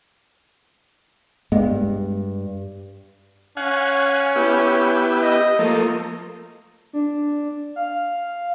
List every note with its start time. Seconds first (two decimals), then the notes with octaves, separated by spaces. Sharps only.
1.52 G2 G#3 B3
3.57 C#4 F5 F#5 G#5
4.36 B3 E4 G4
5.22 D#5
5.59 F3 A3 A#3
6.93 D4
7.76 F5